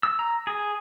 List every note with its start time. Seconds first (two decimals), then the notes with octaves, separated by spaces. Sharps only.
0.03 E6
0.19 A#5
0.47 G#4